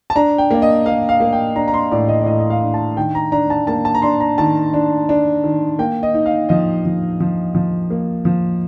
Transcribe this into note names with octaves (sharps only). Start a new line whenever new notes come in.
A5
D4 A#5
G5
A#3 D5
D#5
A#3 F5
F5
A#3
G5
D4 A#5
A#5
C6
A2 D5
D#5
D5
A2 D#5
D#5
F5
D4
A5
D#3 G5
A#5
D4 A#5
A5
A#3 A5
A5
A#5
D4 C6
A#5
D#3 A5
D4
D4
D#3
A#3 G5
D#5
D#4
F5
F3 D#5
F3
F3
F3
A#3
F3